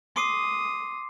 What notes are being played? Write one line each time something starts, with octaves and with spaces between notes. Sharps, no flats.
C6 D6 D#6 C7